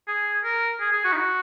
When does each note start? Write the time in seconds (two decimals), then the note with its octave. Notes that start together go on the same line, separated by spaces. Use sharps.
0.07 G#4
0.44 A#4
0.80 G#4
0.92 G#4
1.04 F#4
1.12 D#4
1.16 F#4